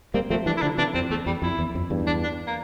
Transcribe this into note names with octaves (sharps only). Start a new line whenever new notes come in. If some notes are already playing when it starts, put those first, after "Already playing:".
G3 A#3 C4
F3 A3 C4
E3 G3 D4
E4
D3 F3 D4
C3 E3 D4
F2 C4
E2 A3
E2 G3
F2 E4
E2
F2
E2 G2
D4
D4
A#3